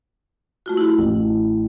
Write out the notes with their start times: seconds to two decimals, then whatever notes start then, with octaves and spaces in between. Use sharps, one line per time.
0.66 A3 F4 F#4
0.77 E4 G4 G#4
0.98 A1